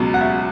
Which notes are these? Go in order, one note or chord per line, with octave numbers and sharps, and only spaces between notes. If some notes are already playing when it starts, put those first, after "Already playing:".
Already playing: C#2 B2 F#3
F#5
E5